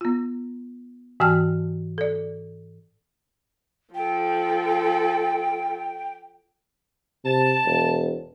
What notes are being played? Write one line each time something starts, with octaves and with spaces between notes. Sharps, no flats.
B3 F4
G#2 E3 F#4 G5 A5 F6
A4 D5
F3 A4 G5
C3 A5
E1